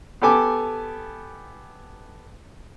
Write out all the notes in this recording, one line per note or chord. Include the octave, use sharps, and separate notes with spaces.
B3 G4 A4 G#5 D6